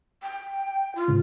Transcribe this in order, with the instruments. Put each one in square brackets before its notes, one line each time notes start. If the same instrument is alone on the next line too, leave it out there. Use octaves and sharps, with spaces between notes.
[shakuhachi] G5
F4
[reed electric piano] G#2 C#3